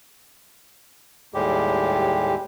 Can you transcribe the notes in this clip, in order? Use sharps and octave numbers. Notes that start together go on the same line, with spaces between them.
D#2 A2 G3 G#3 G4